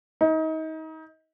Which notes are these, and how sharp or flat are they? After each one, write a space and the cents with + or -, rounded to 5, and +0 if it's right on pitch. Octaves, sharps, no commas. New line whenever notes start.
D#4 +30